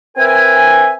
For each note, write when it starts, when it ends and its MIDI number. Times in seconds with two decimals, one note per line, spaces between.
0.17 0.94 60
0.17 0.94 70
0.17 0.94 71
0.17 0.94 76
0.17 0.94 80